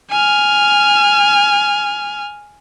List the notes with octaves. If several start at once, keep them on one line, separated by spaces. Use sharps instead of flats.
G#5 F6